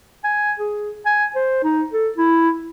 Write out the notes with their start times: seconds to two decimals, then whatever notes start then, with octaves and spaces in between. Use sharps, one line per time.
0.24 G#5
0.59 G#4
1.06 G#5
1.36 C5
1.64 D#4
1.92 A4
2.18 E4